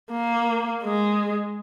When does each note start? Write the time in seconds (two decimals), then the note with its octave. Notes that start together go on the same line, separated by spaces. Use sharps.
0.11 A#3
0.83 G#3